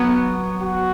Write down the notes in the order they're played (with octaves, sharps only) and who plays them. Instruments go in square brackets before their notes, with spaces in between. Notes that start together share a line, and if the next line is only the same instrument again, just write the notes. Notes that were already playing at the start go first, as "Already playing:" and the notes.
Already playing: [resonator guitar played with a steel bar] F#3 B3
[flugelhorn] F#4